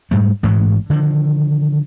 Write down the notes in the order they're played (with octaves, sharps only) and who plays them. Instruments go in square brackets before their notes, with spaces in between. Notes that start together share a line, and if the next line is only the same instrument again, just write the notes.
[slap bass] G#2 G3 A3
A1 G#2 B2 E3
D3 D#3 F3